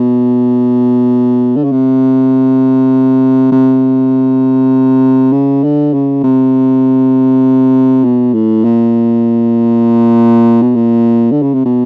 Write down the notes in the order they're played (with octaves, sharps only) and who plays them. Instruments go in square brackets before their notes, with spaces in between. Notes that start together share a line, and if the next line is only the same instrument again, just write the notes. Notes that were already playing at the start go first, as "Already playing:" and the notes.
Already playing: [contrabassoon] B2
D3
C#3
C3
C3
C#3
D3
C#3
C3
B2
A2
A#2
B2
A#2
D3
C#3
C3
B2